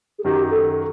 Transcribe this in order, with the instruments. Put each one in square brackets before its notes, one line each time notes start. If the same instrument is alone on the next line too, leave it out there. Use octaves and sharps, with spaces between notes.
[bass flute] G#4
[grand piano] F#2 D#3 F#3 [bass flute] G4
[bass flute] A4